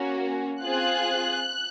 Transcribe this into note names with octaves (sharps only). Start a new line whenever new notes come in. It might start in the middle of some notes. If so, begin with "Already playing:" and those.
Already playing: A#3 C#4 F#4
C4 F4 G#4 F#6